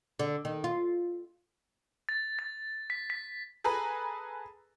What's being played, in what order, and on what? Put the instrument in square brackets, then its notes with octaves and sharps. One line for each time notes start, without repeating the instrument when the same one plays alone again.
[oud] D3
D#3
F4
[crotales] A6
A6
B6
B6
[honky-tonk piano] G#4 A4 B4 G#5 A#5 B5